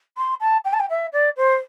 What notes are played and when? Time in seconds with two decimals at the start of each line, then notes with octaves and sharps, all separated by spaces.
0.17 C6
0.40 A5
0.64 G5
0.73 A5
0.79 G5
0.89 E5
1.12 D5
1.36 C5